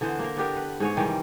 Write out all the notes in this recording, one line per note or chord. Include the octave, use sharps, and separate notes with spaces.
D3 E3 B3 C5
A#3 A#4
B3 D4 G4 A#4
B4
G#2 G#4 C#5
C3 D#3 E3 G3